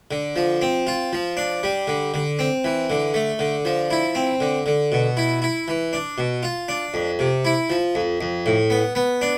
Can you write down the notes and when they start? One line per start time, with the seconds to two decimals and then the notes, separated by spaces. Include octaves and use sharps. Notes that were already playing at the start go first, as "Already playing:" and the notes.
0.11 D3
0.36 F3
0.62 C4
0.87 F4
1.13 F3
1.37 D4
1.63 G3
1.87 D3
2.14 D3
2.39 C4
2.64 E3
2.90 D3
3.14 A3
3.39 D3
3.65 F3
3.91 E4
4.15 C4
4.40 D3
4.66 D3
4.92 B2
5.17 E4
5.42 E4
5.68 E3
5.93 D4
6.18 B2
6.43 F4
6.68 D4
6.94 F2
7.19 C3
7.45 E4
7.70 F3
7.95 F2
8.21 F2
8.46 A2
8.70 B3
8.95 B3
9.22 D4